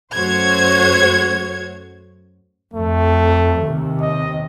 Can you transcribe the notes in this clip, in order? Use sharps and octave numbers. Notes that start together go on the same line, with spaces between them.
F#2 A3 F#4 C5 C#5 G#6
F2 A3
D#2 C3
D#5